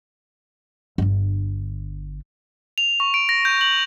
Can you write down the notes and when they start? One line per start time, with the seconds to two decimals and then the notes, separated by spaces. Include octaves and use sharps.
0.98 G1 D4
2.78 F7
3.00 C#6
3.14 D7
3.29 A#6
3.45 G6
3.61 F#7